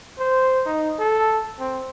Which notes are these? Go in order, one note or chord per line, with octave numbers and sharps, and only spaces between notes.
C5
D#4
A4
C4